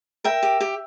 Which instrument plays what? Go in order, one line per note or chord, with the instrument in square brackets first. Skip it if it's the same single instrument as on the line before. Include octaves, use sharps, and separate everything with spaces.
[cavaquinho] A#4 E5 G5
G4
G4